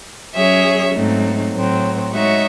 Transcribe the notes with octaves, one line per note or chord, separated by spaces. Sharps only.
F#3 C#4 G#4 C#5 E5
G#2 F#3 A3 C4 D#4
A2 F#3 C4
G#3 D#4 F#4 C#5 E5